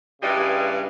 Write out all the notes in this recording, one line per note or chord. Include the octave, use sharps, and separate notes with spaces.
G2 C#3 E3 G3 G#3